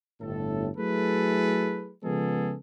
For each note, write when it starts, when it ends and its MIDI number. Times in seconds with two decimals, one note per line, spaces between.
0.21 0.70 31
0.21 0.70 45
0.21 0.70 69
0.78 1.93 54
0.78 1.93 57
0.78 1.93 64
0.78 1.93 68
0.78 1.93 69
0.78 1.93 71
2.04 2.55 49
2.04 2.55 53
2.04 2.55 56
2.04 2.55 59
2.04 2.55 68
2.04 2.55 69